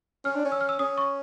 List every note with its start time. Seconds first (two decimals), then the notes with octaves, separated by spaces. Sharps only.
0.25 C#4 F6
0.35 D4
0.45 C#4
0.52 E6
0.61 F6
0.69 E6
0.79 C#4 D#6
0.98 C#6